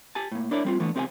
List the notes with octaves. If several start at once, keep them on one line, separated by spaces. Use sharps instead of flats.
G4 G#5 A5
A2 A#3
D4 E4 A#4 C#5 D5
G3 C4 F4
D3 E3 A3 B3
C#2 C4 G4 D5 F5 G#5